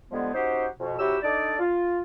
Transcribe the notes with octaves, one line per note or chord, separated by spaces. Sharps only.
D3 F3 G3 G#3 B3
C#4 D#4 F#4 G4 C5
F2 B2
C3 F#3 E4 F#4 G4 E6
D4 D#4 A4 D5
F4